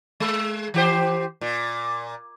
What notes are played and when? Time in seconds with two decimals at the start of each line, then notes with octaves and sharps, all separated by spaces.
0.20 G#3
0.74 E3 G4 C5
1.41 A#2